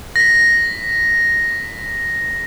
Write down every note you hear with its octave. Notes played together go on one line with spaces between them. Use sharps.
A#6 B6